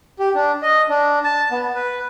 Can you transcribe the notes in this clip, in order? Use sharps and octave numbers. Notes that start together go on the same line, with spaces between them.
G4
D4
D#5
D4
A5
B3
B4